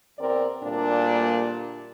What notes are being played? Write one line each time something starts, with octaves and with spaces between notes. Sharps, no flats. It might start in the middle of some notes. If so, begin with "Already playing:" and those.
E2 C4 A#4 D5
D2 A#2 G3 A#3 D4